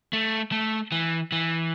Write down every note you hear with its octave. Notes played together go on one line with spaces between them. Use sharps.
A3
A3
E3
E3